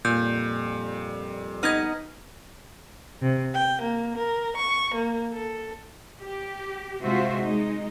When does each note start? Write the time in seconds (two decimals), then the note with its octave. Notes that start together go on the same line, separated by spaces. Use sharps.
0.05 F2 A#2 G3 G6
1.63 B3 D#4 D#5 F6 G#6
3.21 C3
3.54 G5
3.82 A#3
4.17 A#4
4.58 C#6
4.95 A#3
5.33 A4
6.20 G4
7.02 C3 G#3 F4 F#4 C5 E5
7.41 G#3 D#4